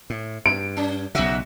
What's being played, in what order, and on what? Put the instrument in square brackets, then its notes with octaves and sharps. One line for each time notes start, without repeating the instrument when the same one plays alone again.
[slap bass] A2
[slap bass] G2 [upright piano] D7
[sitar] C#4
[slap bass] B1 C#3 [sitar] G#2 F#4 E5